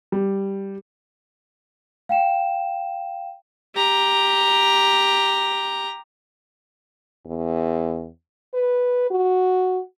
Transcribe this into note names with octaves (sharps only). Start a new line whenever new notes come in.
G3
F5 G5 E7
G4 A#5
E2
B4
F#4